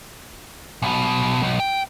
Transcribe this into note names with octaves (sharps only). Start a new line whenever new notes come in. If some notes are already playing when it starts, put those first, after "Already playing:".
B1 B2
B1
G5